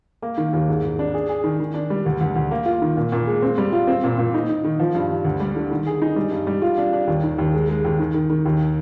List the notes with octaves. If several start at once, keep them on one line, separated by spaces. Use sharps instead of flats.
A#3
D#3
D#2
G#2
G#2
D4
G#4
G#4
D#3
D#3
D4
G3
D2
D2
D2
A#3
F4
D#3
A#2
A#2
G#3
C4
G3
F4
C4
A#2
A#2
D#4
D#4
D#3
F3
G2
G2
D2
G3
D3
D#3
G#4
D#4
G3
G2
G3
F4
D4
D4
D#2
D#3
D#2
G#3
G#3
D#2
D#3
D#3
D#3
D#2